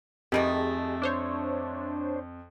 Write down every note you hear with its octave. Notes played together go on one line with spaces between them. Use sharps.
F2 D#3 G3 A3 G4 G#4 D#5
D4 C5 C#5